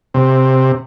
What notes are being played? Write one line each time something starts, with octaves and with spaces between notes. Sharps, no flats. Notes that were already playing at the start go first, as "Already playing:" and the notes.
C3